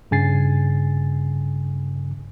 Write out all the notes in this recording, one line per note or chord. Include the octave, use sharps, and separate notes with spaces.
G2 C#3 G#5 A6 C7